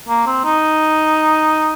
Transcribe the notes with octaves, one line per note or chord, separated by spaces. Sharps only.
A#3
C4
D#4